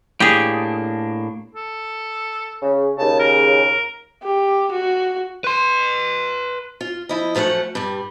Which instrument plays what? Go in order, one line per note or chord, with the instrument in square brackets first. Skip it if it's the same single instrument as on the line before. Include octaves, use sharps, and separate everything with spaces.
[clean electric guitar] A2 A#3 D4 [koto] G4 G#4
[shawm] A4
[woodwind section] C#3
[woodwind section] D#2 C#3 [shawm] A5
[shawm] A#4
[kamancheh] G4
F#4
[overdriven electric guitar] B4 C6
[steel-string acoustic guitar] F4
F3 E4 D#5
F#2 F3 A3 A4 F#5
G2 G3